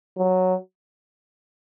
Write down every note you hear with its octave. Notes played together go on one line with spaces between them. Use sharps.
F#3